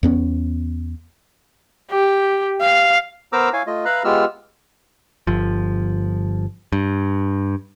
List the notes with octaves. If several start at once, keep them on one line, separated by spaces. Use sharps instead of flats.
E2 B3 C#4
G4
F5
B3 A#4 C5 A#5 D6 E6
E4 C#5 F5 G#5
A3 F4 D#5
B4 E5 F5 A#5 B5 F#6
G#3 B3 F4 G4 E6 F6
G1 F3
G2